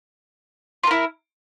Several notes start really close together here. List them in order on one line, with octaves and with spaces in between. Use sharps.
F4 A#4 E4